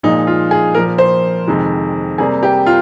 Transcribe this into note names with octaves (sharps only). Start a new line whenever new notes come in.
A#2 F3 G#3 D#4
F4
G#4
A#2 F3 A#3 A#4
C5
F2 C3 D#3 G#3
C3 G3 A#3 G#4
G4
F4